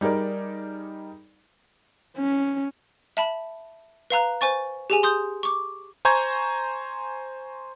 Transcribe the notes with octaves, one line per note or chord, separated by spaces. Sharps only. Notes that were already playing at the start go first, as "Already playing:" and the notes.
G3 D#4 G#4 A#4 D5
C#4
E5 A5 B5
B4 F5 A#5 F#6
C5 G#5 C#6 A6
G4 G#4 G#5
C6 D#6 G6
C#6 D6
C5 G#5 A#5 C#6 G6 G#6